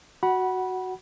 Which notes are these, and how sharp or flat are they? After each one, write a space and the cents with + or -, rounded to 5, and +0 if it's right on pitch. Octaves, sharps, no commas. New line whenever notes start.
F#4 +0 F#5 +15 B5 -20